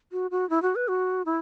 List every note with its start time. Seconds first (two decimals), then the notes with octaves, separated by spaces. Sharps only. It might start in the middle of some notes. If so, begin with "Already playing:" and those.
0.12 F#4
0.31 F#4
0.50 E4
0.62 F#4
0.76 B4
0.88 F#4
1.26 E4